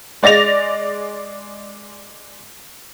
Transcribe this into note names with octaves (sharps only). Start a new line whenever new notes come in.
G#3 D5 A6 A#6 F7